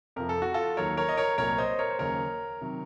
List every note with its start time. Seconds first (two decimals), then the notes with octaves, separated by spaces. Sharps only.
0.16 F2 C3 F3 A#4
0.29 A4
0.42 F#4
0.54 F4 A4
0.77 D#2 D#3 F#3 A#4 C#5
0.97 A#4 C#5
1.09 D#5
1.17 A#4 C#5
1.38 C2 A#2 F#3 A#4 C#5
1.58 C5 D#5
1.79 A#4 C#5
1.90 C5
1.99 D#2 C#3 F#3 A#4 C#5
2.61 C3 D#3 F#3